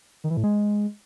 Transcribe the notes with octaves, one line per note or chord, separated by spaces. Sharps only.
D#3
E3
A2
G#3